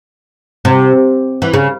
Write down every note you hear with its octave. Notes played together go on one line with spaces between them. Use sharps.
C3
E3
C#3